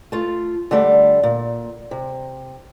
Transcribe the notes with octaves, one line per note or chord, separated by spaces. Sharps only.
A3 F4
D3 G3 A3 D5
A#2
C3